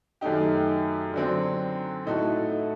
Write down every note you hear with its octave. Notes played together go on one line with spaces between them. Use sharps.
F#2 D#3 A3 D#4 G4
D3 F#3 C4
A2 A3 D#4 F#4 A4